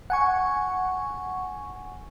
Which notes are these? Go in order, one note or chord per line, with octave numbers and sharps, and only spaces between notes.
F#5 G#5 C#6